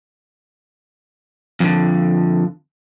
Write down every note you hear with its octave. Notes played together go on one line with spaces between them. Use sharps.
F2 D3